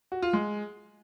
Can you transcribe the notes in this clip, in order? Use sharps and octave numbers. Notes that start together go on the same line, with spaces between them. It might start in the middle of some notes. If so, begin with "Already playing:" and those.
F#4
F4
G#3